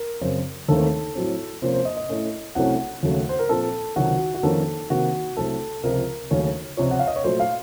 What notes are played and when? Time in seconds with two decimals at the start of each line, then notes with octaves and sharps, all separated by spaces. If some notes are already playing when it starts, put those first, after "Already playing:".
Already playing: A#4
0.21 F#2 C#3 F#3 C4
0.68 D#2 D#3 A3 C4 A4
1.15 A2 F#3 C4
1.62 C3 F3 A#3 C#4 C5
1.74 C5
1.85 D#5
1.97 D#5
2.09 A2 A3 C#4
2.55 C2 C3 F#3 A3 C#4 F#5
3.03 D#2 C#3 F#3 A3
3.29 C5
3.39 A#4
3.49 A#2 F3 C4 A4
3.96 C#2 C3 D#3 F#3 C4 F#4
4.34 F#4
4.43 F2 D#3 A#3 C#4 A4
4.90 C3 D#3 A#3 F#4
5.37 C2 C3 F#3 A3 A4
5.83 C#2 C3 F3 C4 A#4
6.31 D#2 C#3 F#3 A3 C#4
6.77 C#2 C3 F3 C#5
6.91 F#5
6.99 F5
7.07 D#5
7.16 C#5
7.24 A#2 F#3 A3 C5
7.40 F5